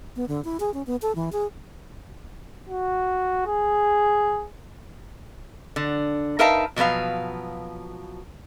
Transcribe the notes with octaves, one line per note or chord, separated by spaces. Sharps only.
B3
D3
E4
G#4
C#4
B3
A4
E3
G#4
F#4
G#4
D3
D#4 A#4 B4 E5 F5 A5
B2 F3 F#3 B4 F5